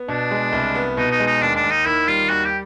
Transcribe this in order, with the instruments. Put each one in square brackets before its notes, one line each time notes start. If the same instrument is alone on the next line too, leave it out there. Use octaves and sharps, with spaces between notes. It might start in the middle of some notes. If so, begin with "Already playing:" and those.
Already playing: [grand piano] B3
[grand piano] B2 [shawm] D4
[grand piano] G#3
C2
B3
[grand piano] B2 [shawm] D#4
[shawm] D#4
[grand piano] G#3
[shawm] D#4
[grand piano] D#2 [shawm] D4
[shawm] D4
[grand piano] D#2
[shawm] D#4
[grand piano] D#3 [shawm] E4
[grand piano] G3 [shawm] F4
[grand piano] D#2 [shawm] F#4
[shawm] G4